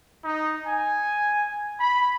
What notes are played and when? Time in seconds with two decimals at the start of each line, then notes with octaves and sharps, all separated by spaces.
0.24 D#4
0.66 G#5
1.80 B5